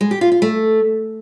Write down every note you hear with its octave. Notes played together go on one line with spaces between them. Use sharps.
G#3
G4
F4
F4
A3